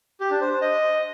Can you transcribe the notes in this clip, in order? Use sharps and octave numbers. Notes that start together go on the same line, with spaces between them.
G4
D4
C5
C5
D#5